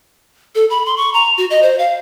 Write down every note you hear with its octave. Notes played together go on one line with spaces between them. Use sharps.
A4
B5
C6
C#6
A#5
F#4
D#5
C5
F5